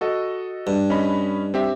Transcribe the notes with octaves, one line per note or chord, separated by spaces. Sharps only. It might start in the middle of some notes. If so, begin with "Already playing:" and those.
F#4 A4 D#5
G2
C#4 D#5 B5
C4 G4 E5